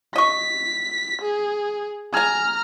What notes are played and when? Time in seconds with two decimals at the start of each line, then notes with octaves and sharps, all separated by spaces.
0.16 D#5 C#6 B6
1.22 G#4
2.14 G#4 G#5 A#5 F6